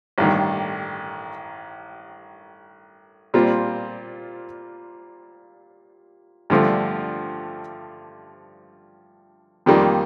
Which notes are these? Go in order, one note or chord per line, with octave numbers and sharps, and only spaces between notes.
A1 G2 D#3
A#2 G3 C4 F4
G2 D3 F3 A3
F2 D#3 G3 A#3 F4